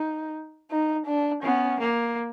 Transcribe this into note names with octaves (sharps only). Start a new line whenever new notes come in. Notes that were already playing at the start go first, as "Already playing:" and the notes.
Already playing: D#4
D#4
D4
B3 C#4
A#3